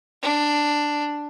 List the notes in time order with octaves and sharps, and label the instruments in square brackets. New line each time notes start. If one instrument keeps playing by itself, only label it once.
[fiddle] D4